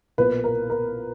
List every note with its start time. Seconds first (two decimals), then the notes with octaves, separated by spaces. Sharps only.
0.18 B1 A#2 A#3 B4
0.44 A#4
0.70 A#4